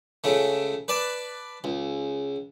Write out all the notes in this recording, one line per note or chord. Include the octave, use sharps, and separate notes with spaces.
C#2 C#3 A3
B4 D5 A5
C#2